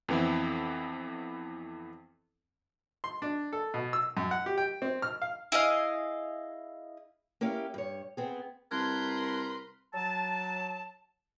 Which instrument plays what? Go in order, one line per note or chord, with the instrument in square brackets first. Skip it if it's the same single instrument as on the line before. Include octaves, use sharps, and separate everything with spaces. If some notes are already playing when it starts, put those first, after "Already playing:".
[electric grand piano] F2 E3 B3 C4 E4
[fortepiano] C6
D4
A4
B2
E6
F#2
F#5
G4
G5
C4
F6
F5
[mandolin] E4 G#4 D#5 F5
[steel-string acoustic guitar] A#3 C#4 E4 G4 F5
G2 C#5
B3 C4 G#4
[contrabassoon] C2 [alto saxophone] A#4 [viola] B4 C6 [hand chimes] A5 F#6 G#6
[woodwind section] F#3 A5